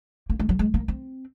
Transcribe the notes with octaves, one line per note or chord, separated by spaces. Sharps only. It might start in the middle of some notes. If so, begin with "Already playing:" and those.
A#3
G#3
F#3
G#3
A#3
C4